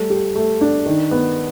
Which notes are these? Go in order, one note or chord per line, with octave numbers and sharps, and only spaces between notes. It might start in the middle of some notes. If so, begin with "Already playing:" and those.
Already playing: G3 A3
G4
A3
D4
D#3
B3